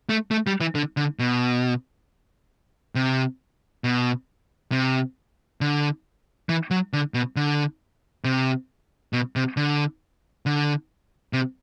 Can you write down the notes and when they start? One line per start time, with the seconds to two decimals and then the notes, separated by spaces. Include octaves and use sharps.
0.09 A3
0.31 A3
0.47 G3
0.61 E3
0.75 D3
0.97 D3
1.19 B2
2.95 C3
3.84 B2
4.72 C3
5.61 D3
6.49 E3
6.71 F#3
6.93 D3
7.14 B2
7.36 D3
8.25 C3
9.13 B2
9.36 C3
9.57 D3
10.46 D3
11.33 C3